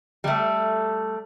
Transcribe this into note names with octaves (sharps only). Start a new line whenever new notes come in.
G3 A3